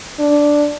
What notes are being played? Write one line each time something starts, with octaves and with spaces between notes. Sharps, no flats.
D4